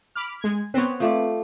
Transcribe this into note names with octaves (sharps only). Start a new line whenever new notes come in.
B5 D6 F6
G#3 G#6
B3 C4 B4 C#5
F3 A3 D5